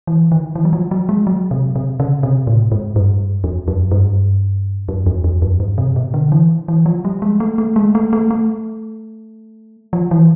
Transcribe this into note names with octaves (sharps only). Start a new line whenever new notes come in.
E3
D#3
E3
F#3
F3
F#3
G#3
F#3
C3
C3
C#3
C3
A2
G#2
G2
F2
F#2
G2
F#2
F2
F2
F#2
G2
C3
B2
D3
E3
E3
F3
G3
G#3
A3
A3
G#3
A3
A3
A3
F3
E3